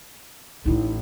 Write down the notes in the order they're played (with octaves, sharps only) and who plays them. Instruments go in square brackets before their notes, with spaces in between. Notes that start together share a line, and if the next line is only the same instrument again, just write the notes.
[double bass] A1 [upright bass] D#4 E4